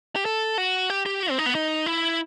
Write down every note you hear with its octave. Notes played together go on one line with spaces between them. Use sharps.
G4
A4
F#4
G4
G4
F#4
C4
D#4
B3
D#4
E4